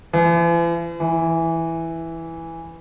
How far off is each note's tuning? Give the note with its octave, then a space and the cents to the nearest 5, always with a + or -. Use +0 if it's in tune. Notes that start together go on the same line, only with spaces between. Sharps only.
E3 +45
E3 +0